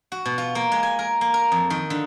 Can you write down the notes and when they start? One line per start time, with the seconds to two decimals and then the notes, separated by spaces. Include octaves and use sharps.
0.12 F#4
0.25 B2
0.38 F4
0.55 A#3
0.72 G#3
0.83 G#5
0.99 A#4
1.21 A#3
1.34 A#4
1.52 F2
1.70 D#3
1.90 D3